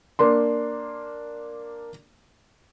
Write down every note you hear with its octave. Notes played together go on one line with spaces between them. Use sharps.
A#3 D4 C6